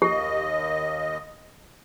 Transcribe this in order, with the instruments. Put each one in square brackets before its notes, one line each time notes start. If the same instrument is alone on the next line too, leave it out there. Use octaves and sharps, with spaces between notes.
[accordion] D#2 D#5 [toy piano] G4